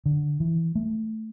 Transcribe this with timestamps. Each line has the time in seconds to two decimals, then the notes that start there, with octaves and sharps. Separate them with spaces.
0.06 D3
0.40 E3
0.75 A3